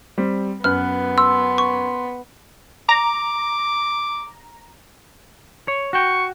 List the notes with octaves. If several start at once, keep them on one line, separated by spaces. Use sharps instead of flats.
G3 C4
F#2 B3 B4 F6 F#6
C6 E6
C#6
A#5 D6
C#5
F#4 G5 C#6